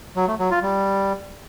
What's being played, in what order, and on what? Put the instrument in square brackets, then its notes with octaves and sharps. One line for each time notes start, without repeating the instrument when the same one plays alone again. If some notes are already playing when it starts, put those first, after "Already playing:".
[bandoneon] F#3
A3
F#3
F4
G3